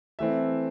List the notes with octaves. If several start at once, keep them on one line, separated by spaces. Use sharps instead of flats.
E3 A3 C4 E5